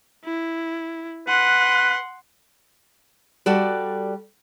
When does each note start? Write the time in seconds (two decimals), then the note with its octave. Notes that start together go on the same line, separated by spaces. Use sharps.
0.24 E4
1.28 B4 F#5 C6
3.46 G3 F#4 A4 D5